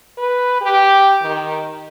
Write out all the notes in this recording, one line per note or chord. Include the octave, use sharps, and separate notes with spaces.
B4
G4
D#3